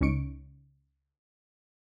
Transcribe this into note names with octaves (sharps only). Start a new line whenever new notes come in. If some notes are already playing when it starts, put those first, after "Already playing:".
C#2 C#4 D#4 C#6 C#7 D7